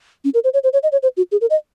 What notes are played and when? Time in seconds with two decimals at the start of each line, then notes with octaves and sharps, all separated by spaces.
0.25 C#4
0.34 A#4
0.44 C5
0.54 C#5
0.64 C5
0.73 C#5
0.83 D#5
0.92 C#5
1.03 C5
1.17 F#4
1.32 G#4
1.41 A#4
1.50 D#5